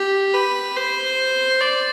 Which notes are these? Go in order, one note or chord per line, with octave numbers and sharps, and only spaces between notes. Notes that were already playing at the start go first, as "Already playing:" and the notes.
Already playing: G4
B4
C5
D5